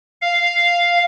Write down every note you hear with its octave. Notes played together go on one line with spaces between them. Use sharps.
F5